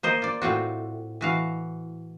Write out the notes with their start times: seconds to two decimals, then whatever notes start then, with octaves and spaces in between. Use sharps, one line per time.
0.03 A#3 C5 D#5
0.22 F4 D5
0.42 A2 C4 F4 F#4
1.21 E3 F#4 F5